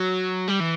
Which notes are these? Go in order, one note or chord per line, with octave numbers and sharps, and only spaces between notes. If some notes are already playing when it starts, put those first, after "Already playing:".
Already playing: F#3
G3
E3